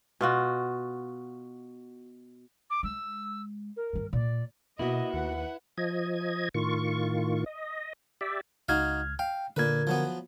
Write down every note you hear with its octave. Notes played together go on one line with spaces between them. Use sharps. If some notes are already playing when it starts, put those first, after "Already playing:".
B2 F4 F#4
D6
G#3 E6
A#4
G2 D#3
A#2 D5
B2 A#3 B3 E4 F#4 D#5
D#2 B4 F#5
F3 D#5 G#6
A2 D#3 F4 C#6
D#5
G4 D5 E5
C#2 D#4 F#4 F5 F6 G#6
F5 G5
A#2 D3 A#4 B4 G#6
F3 F#3 B3